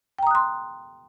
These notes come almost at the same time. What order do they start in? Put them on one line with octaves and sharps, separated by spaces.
G5 A#5 D#6 F#6 C6